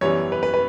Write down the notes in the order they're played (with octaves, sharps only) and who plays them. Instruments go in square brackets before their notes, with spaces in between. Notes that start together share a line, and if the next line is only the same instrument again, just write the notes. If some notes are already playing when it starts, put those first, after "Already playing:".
[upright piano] F#2 E3 G3 B3 C#5
B4
B4
B4